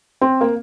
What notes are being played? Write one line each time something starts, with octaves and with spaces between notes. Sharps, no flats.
C4
A#3